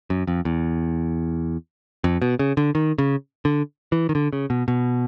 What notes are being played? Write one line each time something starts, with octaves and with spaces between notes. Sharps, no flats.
F#2
F2
E2
F2
B2
C#3
D3
D#3
C#3
D3
E3
D#3
D3
C#3
B2
B2